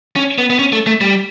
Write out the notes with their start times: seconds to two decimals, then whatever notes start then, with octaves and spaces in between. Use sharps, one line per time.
0.16 C#4
0.38 B3
0.50 B3
0.59 C#4
0.73 A3
0.87 A3
1.01 G3